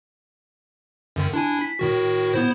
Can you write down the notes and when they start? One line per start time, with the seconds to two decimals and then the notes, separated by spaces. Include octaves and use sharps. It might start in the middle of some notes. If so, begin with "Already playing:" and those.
1.16 F#2 D3 D#3
1.33 D4 E4 G#5
1.61 B6
1.79 A2 D#3 F#4
2.34 B3 E4 C5